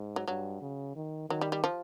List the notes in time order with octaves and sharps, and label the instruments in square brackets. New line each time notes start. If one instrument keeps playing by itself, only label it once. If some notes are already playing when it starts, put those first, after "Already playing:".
Already playing: [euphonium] G#2
[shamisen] F#3
[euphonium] G2 [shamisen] F#3
[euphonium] C#3
D#3
[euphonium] D#3 [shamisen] F#3
[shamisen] G3
G3
F3